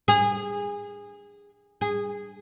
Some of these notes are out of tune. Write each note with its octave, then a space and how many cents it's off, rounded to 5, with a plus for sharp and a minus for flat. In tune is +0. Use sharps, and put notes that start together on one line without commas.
G#4 -25
G#4 -15